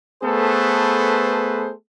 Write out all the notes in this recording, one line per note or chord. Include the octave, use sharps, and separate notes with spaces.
A3 B3 G#4 A4 B4 C5